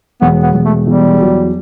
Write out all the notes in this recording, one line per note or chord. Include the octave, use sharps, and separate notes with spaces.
E1 B3
B3
E1
A3
E2 G3
F#3